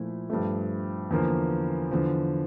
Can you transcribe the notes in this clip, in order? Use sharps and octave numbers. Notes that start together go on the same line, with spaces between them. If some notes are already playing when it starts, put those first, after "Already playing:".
Already playing: A#2 F3 A3 E4
G2 F3 A3
E2 D3 F3 A#3
E2 D3 F3